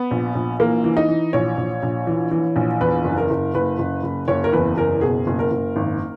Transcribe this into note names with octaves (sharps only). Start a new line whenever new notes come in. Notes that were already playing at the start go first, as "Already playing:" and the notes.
Already playing: B3
A#1
A#1
E3 A#3
E3
D#4
E3
A#1 C#5
A#1
A#1
E3
E3
A#1
E2 B4
F#1
A#4
F#1
F#1 B4
F#1
F#1
F#1 C#5
A#4
E2 B4
F#1 A#4
B2 G#4
F#1
A#4
F#1
G#1